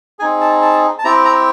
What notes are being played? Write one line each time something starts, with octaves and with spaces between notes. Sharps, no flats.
C4 D#4 G#4 G#5
A5
A5
A5
C4 E4 G4 A#5
A#5